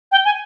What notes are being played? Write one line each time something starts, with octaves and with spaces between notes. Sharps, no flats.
G5
G#5